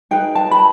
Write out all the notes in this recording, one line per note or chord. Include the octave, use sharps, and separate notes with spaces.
D#4 G#4 B4 G5
A5
B5